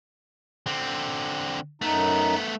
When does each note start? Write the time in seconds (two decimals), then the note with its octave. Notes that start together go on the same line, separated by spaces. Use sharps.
0.66 D3 C4
1.82 F#2 A3 B3 D#4